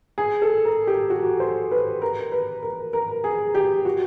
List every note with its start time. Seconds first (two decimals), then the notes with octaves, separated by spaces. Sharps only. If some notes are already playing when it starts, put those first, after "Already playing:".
0.18 G#4
0.42 A4
0.65 A#4
0.87 G4
1.10 F#4
1.40 C5
1.71 B4
2.02 A#4
2.32 B4
2.63 A#4
2.93 A#4
3.24 G#4
3.55 G4
3.85 F#4